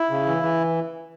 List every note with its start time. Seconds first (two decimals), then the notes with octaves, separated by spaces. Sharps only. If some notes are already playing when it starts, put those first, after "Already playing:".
Already playing: E4
0.11 C#3
0.27 E3
0.43 E3